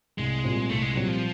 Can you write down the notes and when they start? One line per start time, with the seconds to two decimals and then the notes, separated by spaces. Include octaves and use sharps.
0.18 C2 G#3
0.44 A#2 G3 C4
0.69 C2 A3
0.82 G#3
0.95 A#2 F#3 G3 C4
1.08 F3